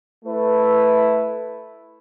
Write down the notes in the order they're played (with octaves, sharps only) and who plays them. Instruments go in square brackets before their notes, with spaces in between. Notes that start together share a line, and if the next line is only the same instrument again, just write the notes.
[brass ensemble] A3 E4 B4